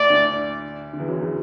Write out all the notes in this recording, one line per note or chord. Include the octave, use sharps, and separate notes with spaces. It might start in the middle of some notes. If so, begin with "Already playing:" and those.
Already playing: A2 A3 D5
D2 D3
D3
E2 E3
F#2 F#3
E2 E3
F#3